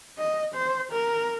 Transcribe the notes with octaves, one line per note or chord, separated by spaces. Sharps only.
D#5
C5
A#4